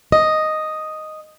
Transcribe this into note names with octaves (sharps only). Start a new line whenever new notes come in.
D#5